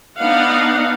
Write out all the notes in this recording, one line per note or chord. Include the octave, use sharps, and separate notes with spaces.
B3 D4 D#4 F5 F#5